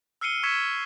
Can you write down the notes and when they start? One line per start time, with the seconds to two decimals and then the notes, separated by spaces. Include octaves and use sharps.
0.21 E6 F6 C7 C#7 D#7 G7
0.43 C#6 E6 G#6 B6 C#7 E7